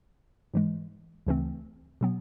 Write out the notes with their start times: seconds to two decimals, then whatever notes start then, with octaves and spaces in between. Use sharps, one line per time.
0.54 G#2 E3 G#3
1.27 D2 C#3 E3 A3 C4
2.01 B2 F#3 B3